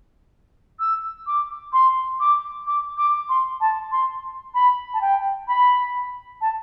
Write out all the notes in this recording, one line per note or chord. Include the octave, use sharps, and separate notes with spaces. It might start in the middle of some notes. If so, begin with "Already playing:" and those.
E6
D6
C6
D6
D6
D6
C6
A5
C6
B5
A5
G5
B5
A5